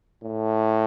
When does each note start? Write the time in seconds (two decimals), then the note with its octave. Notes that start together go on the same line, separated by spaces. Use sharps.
0.22 A2